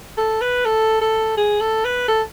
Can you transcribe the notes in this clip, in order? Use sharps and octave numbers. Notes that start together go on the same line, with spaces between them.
A4
B4
A4
A4
G#4
A4
B4
A4